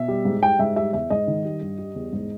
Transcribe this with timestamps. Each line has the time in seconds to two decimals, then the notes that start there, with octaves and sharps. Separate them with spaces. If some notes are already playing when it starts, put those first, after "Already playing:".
Already playing: B2 E5
0.08 G3
0.25 G#2
0.42 G3 G5
0.59 G#2 E5
0.76 G3 E5
0.93 E2 E5
1.10 G#2 D#5
1.27 D#3
1.45 G3
1.61 G2
1.79 G3
1.95 E2
2.13 G#2